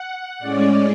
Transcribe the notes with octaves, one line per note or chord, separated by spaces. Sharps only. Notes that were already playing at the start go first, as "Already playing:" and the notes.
Already playing: F#5
A2 G#3 C#4 D5